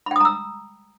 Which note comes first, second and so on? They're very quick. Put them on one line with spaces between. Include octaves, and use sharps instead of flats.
B5 G5 D#6 A#5 E6